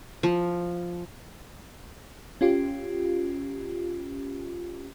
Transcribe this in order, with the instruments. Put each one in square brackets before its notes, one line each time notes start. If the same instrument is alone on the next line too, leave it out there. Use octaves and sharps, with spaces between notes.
[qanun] F3
[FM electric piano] C#4 F4 G4